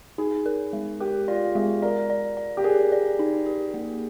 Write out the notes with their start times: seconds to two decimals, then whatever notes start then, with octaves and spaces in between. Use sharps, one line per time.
0.18 D#4 G#4
0.46 A#4
0.73 G#3
1.00 G4 A#4
1.28 F4 D5
1.55 G#3 G#4
1.82 A#4 D5
2.10 D5
2.37 D5
2.57 G4
2.64 G#4 A#4
2.92 D5
3.19 D#4
3.46 G4
3.74 A#3